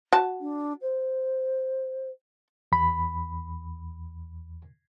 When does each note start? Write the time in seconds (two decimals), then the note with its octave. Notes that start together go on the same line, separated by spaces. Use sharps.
0.13 F#4 A5
0.41 D4
0.82 C5
2.72 E2 B5